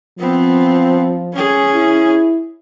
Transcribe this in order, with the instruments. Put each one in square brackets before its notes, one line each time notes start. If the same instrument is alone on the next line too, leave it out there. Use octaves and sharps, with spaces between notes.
[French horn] F3 [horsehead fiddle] B3 C4
[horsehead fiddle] C#4 G#4
[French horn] E4